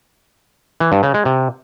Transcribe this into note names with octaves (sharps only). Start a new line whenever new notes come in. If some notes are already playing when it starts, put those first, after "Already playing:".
E3
G2
C#3
G#3
C3